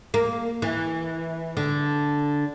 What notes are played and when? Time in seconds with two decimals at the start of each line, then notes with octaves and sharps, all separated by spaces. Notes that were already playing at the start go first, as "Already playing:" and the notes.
0.14 A#3
0.62 E3
1.57 D3